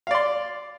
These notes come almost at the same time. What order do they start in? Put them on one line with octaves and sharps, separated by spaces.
F5 D5 C6